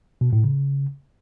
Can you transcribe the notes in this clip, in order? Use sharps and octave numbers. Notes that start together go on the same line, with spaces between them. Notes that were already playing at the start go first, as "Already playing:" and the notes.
B2
A2
C#3